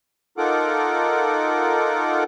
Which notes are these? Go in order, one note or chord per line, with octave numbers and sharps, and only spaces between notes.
D#4 F4 A4 A#4 F#5 D6